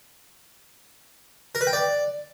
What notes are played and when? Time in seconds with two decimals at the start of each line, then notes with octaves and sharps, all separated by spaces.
1.55 A#4
1.61 B4
1.67 G5
1.73 D5